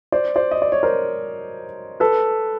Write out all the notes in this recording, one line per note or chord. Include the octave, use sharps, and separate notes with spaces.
C5 D5
C5 D5
D#5
D5
C#5
A#4 C5
A4 B4